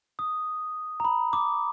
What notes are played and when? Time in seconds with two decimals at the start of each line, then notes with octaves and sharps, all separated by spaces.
0.19 D#6
1.00 A#5
1.05 B5
1.33 D6